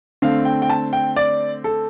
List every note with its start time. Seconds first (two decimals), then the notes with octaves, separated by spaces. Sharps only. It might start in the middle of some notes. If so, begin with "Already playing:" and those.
0.22 D3 A3 C4 F5
0.45 G5
0.62 G5
0.69 A5
0.93 G5
1.16 D5
1.64 A4